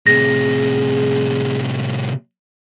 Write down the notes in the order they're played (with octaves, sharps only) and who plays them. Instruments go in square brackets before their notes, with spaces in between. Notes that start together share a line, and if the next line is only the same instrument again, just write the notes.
[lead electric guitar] A2 C3 [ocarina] G#4 [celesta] A#6